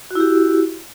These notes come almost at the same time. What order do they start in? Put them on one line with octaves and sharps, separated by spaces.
F#4 E4 G4